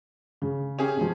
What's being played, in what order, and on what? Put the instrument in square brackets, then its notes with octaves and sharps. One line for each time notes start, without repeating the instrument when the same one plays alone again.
[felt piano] C#3
[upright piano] C#4 G4 G#4
[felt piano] B2 F3